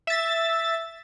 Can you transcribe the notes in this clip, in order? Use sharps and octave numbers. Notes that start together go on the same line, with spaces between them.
E5 A6